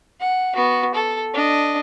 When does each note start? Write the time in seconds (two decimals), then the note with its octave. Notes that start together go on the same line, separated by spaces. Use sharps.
0.21 F#5
0.55 B3 F#4
0.95 A4
1.34 D4 D#5